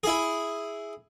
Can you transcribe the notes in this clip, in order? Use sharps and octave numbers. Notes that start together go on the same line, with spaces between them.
E4 G#4